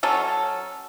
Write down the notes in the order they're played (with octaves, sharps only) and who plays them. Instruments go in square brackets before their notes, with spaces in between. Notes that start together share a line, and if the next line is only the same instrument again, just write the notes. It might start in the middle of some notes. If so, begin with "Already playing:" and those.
[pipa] F#3 C#4 A4